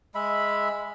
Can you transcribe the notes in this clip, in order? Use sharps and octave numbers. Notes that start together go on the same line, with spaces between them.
G#3 E5 B5